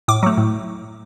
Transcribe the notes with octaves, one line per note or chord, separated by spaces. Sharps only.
A2 D6
F#3 A3
A2